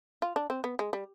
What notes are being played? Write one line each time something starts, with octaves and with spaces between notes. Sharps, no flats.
F4
D4
C4
B3
G#3
G3